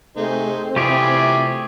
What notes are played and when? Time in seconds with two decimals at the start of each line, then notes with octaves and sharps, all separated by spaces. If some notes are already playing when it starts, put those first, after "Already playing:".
0.17 C3 A3 C4 D#4 G#4 C5
0.76 C3 E3 G3 A3 F4 G4 G#4